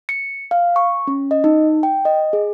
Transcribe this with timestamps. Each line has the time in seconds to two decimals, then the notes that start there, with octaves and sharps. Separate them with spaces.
0.09 C#7
0.51 F5
0.76 C#6
1.07 C#4
1.31 D#5
1.44 D#4
1.83 G5
2.05 D#5
2.33 G#4